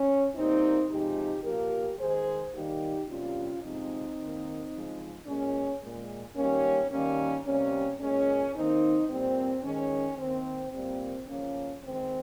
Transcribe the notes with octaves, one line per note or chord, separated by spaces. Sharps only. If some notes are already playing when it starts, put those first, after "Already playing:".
Already playing: C#4
A#2 G3 A#3 C4 D#4
C3 F3 G#3 D#4 G4
A#2 F3 A#3 G4 A#4
D#3 G#3 G#4 C5
D#3 G3 A#3 D#4 G4
C3 G3 A#3 C#4 F4
C3 F3 G#3 C4 D#4
D#3 A#3
C#3 F3 G#3
A#2 G#3 C#4
A#2 G#3
D#3 G3 A#3 C#4
D#3 G3 A#3 C#4
C3 G3 A#3 C#4
A#2 G#3 C#4
D#3 A#3 C4 D#4
A#2 G3 A#3 C4
D#3 G#3 C#4
D#3 A#3 C4
A#2 G3 A#3 C4
C#3 F3 A#3 C#4
D#3 G#3 C4